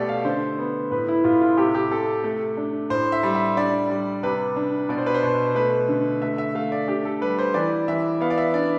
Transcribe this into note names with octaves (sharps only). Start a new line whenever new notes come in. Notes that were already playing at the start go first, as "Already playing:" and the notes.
Already playing: B2 A3 G4 A4 D5
F5
D3 C5
B3
A2 B4
E4
A2 F4
F4
C3 G4
G4
C3 A4
A3
D4
A2 C5
E5
G3
E5
D4 D5
G3
C3 B4
D4
B2 D5
C5
B4
C5
B2
A3 B4
D3
A3 E5
E5
A3 F5
D5
D4 G4
A4
G3 B4
C5
E3 D5
E3 E5
B3 F5
D5
E5
D4 D5